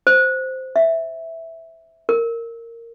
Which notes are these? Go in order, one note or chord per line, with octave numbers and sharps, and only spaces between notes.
C5
E5
A#4